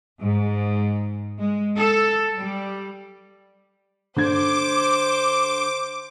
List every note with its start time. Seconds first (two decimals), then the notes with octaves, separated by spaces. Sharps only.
0.21 G#2
1.40 G#3
1.76 A4
2.36 G3
4.16 D3 C5 D6 G#6